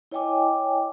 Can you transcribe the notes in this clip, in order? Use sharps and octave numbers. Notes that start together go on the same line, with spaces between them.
E4 C#5 D#5 G5 G#5 D6